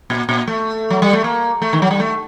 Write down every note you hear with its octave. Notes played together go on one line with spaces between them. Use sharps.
A#2
A#2
A3
F#3
G3
A3
A#3
A3
D#3
F#3
G3
A3